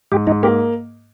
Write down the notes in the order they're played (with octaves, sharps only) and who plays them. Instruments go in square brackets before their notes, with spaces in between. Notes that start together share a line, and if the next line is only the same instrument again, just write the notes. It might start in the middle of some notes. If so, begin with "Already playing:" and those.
[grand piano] G#2 [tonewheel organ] G4
[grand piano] G#2 [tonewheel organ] D#4
[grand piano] A#3 [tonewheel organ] G4